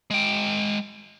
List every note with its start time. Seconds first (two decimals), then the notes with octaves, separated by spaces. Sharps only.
0.11 G#3 G5